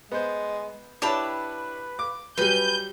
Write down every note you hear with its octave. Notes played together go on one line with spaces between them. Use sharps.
G#3 B3 C5
D4 E4 G4 B4 C#5 A5 B5
D6
F#3 G3 B4 G#5 G6